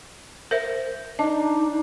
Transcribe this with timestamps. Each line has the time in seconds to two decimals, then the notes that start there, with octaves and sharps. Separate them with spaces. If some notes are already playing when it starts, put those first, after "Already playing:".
0.51 A#4 C5 E5
1.19 D4 D#4 D#5